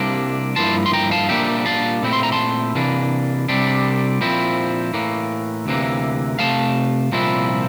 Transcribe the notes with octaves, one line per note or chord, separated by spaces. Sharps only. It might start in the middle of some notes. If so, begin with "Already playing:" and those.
Already playing: C2 C3 G3 A#3 D4
G2 F3 A#3 E4 A5 C6
C6
G5 A#5
F5 A5
A#2 G3 A#3 D4 E5 G5
F5 A5
A#2 A3 C4 E4
C6
A#5
A5 C6
C3 E3 A#3 D4
C2 C3 G3 D4
A#2 F3 C4 E4
A2 E3 A#3
D2 C3 E3 A#3
C3 F3 A3 F5 A5
C2 A#2 F3 C4 E4